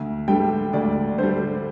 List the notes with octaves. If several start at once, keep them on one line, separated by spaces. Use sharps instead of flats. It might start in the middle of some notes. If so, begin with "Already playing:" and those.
Already playing: D2
D3 G3 G5
D2 D5
D3 G3 C5